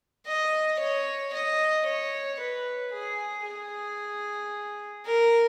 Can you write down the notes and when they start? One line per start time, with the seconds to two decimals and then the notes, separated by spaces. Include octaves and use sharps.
0.27 D#5
0.80 C#5
1.34 D#5
1.86 C#5
2.40 B4
2.93 G#4
3.46 G#4
5.06 A#4